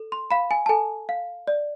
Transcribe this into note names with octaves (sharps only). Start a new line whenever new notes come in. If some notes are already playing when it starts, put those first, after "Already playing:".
Already playing: A4
C6
F5 B5
G#5
A5
A4 G#5
F5
D5